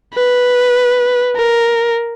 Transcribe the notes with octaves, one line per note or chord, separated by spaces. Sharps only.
B4
A#4